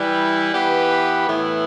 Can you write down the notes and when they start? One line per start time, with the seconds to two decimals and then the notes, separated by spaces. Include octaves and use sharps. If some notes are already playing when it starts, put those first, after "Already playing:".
Already playing: E3 G3 E4 G4 B4
0.53 E3 B3 G4 B4
1.27 A2 E3 B3 E4